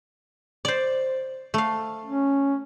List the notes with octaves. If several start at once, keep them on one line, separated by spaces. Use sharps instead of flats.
C5 D5
A3 F5
C#4